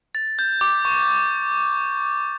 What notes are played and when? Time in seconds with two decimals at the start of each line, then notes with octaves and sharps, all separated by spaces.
0.15 A6
0.39 G6
0.61 D6
0.85 C#6